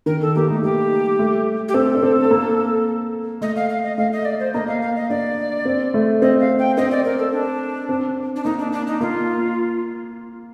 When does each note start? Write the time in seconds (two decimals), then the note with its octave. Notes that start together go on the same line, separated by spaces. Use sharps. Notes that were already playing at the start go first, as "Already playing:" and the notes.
0.06 D#3 A#4
0.21 A4
0.35 A#3 G4
0.48 A3 D#4
0.63 G3 G4
1.19 A3
1.68 G4
1.74 C4 A4
1.95 D4
2.03 C4
2.31 A#3
3.41 A3 D#5
3.56 F5
3.70 F5
3.83 D#5
3.98 A3 F5
4.12 D#5
4.25 D5
4.40 C5
4.54 A#3 D#5
4.68 F5
4.81 F5
4.96 D#5
5.10 D4 D5
5.65 C4
5.94 A3
6.22 C4 D#5
6.40 F5
6.59 G5
6.77 C4 D#5
6.91 D5
7.05 A#4
7.19 A4
7.33 D4
7.89 C4
8.36 D4
8.44 A#3 D#4
8.59 D4
8.72 D4
8.87 D#4
9.00 A#3 F4